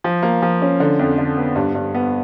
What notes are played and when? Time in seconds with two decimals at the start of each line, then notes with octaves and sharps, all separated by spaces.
0.04 F3
0.23 A#3
0.42 F3
0.62 C#4
0.80 D3
0.99 F2
1.18 D3
1.37 B3
1.56 G2
1.75 G2
1.95 B3